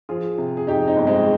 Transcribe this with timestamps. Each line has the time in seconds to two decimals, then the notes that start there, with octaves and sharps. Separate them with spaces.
0.09 F3 F4 G#4
0.38 C3
0.57 G#4
0.67 F2 D#4 G4
0.87 C4 D#4
0.97 G1
1.07 G#3 C4